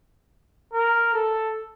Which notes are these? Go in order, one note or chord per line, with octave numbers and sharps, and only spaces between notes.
A#4
A4